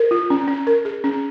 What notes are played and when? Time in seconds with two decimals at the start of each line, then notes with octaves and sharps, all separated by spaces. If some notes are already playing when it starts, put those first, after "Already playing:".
Already playing: A#4
0.11 F4
0.30 C#4
0.48 C#4
0.67 A#4
0.85 G#4
1.04 C#4